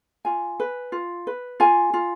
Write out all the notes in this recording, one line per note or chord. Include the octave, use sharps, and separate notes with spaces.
F4 G#5
B4
F4
B4
F4 G#5
F4